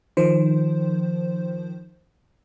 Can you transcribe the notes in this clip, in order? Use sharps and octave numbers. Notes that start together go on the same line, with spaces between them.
D#3 F3 C5